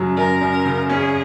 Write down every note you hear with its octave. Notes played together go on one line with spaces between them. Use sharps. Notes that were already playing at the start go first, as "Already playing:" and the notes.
Already playing: F#2 C#3 F#3
F#2 A#4
F#2
C#3
C#4 G#4